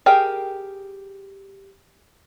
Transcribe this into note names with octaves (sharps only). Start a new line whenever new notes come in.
G4 G#4 A#4 G5